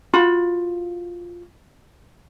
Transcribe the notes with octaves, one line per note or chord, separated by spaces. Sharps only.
F4 F#4 B5